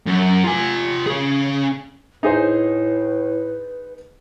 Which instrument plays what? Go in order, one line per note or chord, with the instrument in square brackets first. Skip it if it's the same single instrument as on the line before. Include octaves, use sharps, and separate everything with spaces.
[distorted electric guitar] F#2
F4 G#5
C#4 G#4
[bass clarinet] A2 [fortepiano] D#4 G#4 C5 [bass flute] B4